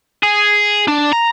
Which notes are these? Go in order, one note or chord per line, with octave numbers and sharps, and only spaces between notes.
G#4
D4
A#5